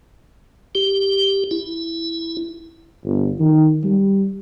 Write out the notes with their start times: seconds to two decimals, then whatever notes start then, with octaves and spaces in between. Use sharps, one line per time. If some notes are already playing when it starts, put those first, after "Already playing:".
0.75 G4
1.51 E4
3.04 G1
3.40 D#3
3.84 G3